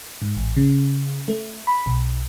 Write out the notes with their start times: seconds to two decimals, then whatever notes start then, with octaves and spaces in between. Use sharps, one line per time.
0.22 G#2
0.36 A1
0.56 C#3
1.28 A3
1.67 B5
1.86 B1